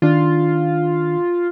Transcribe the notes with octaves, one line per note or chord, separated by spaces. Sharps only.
D#3 D4 F4